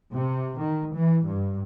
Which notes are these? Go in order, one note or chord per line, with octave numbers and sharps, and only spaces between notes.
C3
D#3
E3
G2